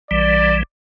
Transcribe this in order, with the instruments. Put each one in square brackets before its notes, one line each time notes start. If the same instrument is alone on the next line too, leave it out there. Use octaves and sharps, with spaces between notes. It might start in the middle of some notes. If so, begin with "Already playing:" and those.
[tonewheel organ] A#1 E3 G3 [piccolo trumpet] D5